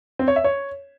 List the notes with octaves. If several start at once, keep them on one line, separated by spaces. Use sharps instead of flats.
C4
C#5
E5
C#5